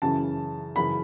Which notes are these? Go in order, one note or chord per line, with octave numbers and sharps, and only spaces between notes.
F#2 C#3 E3 A5
F#2 C#3 E3 B5